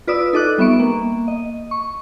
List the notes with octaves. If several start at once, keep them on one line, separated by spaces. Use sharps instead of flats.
F4 B4 D5 D#6 E6
D#4 A4 D#5 D6 F#6
G3 B3 E5 C#6 D7
A#3
D#5
C#6